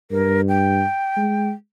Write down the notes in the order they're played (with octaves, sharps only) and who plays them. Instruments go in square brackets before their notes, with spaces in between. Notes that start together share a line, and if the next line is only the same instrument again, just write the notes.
[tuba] G2 [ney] A#4
[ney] G5
[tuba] G#3